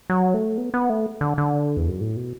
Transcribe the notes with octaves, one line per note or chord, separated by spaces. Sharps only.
F#3
A3
B3
B3
A3
D3
D3
E2
F#2
A2
B2